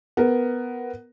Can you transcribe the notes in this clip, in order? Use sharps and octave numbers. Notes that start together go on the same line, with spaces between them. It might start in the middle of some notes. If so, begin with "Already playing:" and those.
B3 A#4